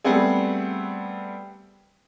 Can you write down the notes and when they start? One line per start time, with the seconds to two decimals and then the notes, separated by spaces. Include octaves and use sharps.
0.04 G3 A3 B3 C4 G#4